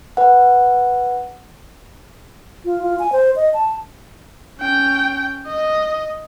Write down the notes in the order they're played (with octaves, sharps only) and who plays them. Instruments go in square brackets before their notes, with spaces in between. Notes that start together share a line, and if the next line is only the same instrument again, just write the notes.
[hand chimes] B4 F#5
[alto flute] F4
F4
G#5
C5
D#5
A5
[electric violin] C#4 G5
D#5